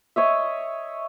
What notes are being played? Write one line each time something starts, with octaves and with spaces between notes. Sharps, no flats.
C#5 D#5 E5